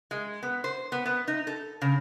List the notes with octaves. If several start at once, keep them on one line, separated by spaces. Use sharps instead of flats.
G#3
B3
C5
B3
B3
D#4
A4
C#3